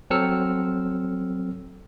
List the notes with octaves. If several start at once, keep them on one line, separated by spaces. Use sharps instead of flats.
F#3 C4 A4 E6 F6 C#7